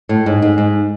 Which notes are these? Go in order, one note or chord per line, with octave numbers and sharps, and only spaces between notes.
A2
G#2
G#2
G#2